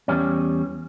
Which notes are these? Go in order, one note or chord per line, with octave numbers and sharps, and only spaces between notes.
E2 G3 C#4